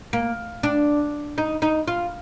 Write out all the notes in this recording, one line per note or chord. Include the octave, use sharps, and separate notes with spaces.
A#3
D4
D#4
D#4
F4